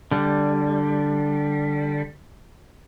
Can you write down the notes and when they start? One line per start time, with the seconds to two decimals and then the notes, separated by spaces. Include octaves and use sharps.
0.11 D3 G3